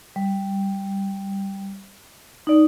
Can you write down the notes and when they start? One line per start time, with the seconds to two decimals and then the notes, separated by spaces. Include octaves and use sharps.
0.16 G3
2.47 D#4 D5